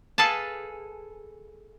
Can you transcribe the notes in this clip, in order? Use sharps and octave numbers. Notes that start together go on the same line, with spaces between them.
G#4 A4 B4 F5 A5